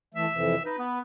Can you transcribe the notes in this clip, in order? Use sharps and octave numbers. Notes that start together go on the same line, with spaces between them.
E3 A3 E5
F2 C3 E3
D#4 B4
B3